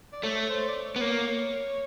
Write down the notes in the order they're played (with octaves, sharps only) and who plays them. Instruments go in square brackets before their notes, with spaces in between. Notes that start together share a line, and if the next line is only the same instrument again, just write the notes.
[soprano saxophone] D5
[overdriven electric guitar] A3 [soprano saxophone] C#5
[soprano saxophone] C5
D5
C#5
[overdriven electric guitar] B3
[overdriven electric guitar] A#3 [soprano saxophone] C#5